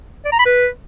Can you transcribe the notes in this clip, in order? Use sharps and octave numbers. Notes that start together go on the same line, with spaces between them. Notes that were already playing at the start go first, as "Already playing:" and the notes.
D5
A#5
B5
B4